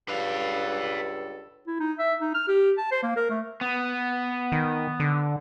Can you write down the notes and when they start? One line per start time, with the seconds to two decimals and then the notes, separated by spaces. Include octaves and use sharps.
0.09 C#2 G2 A4 B4 F5
1.67 E4
1.80 D#4
1.99 E5
2.20 D#4
2.34 F6
2.48 G4
2.78 A5
2.91 C5
3.03 A#3
3.16 A#4
3.30 A3
3.61 B3
4.52 D#3
5.00 D3